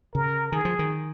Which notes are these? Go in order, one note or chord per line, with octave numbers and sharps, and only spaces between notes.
C#3 A#4
D#3 G#4
F3
D#3